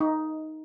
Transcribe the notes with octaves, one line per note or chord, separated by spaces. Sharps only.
D#4